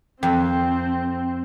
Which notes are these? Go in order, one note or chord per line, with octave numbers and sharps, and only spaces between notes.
F2 C4 G5